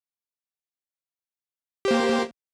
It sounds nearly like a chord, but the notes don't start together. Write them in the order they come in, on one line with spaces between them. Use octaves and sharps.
G4 C5 A#3